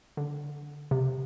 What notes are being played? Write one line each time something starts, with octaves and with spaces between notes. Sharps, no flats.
D3
C3